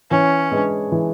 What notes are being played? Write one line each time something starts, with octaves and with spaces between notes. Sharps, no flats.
E3 C#4
G#3 D4 G#4 B4
E3